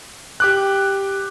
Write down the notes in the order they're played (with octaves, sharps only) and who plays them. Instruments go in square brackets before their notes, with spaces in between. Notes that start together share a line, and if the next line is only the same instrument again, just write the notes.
[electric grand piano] G4 D6 F#6